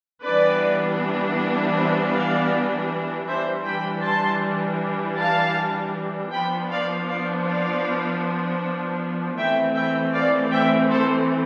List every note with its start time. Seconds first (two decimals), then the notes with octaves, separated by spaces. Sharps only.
0.22 E3 G3 B3 D4 B4 D5
1.74 C5 E5
2.13 D5 F5
3.27 E3 G3 D4 C5 E5
3.65 G5 B5
4.03 A5 C6
5.17 F5 A5
6.32 F3 B3 D4 G5 B5
6.70 D5 F5
7.08 D5 F5
7.46 D5 F5
9.37 E3 A3 C4 E5 G5
9.74 E5 G5
10.13 D5 F5
10.51 E5 G5
10.89 A4 C5